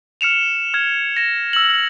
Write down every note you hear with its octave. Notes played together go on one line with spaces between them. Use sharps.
F6 C#7 E7 F7
F6 G#6
A#6 E7
E6 F#7